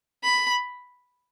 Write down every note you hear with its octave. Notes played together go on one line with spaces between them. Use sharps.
B5